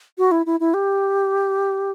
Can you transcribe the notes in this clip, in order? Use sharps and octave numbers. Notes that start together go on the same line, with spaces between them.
F#4
E4
E4
E4
G4